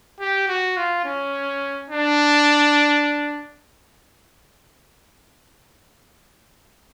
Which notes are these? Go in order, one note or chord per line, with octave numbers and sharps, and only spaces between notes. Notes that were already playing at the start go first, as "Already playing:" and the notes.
G4
F#4
F4
C#4
D4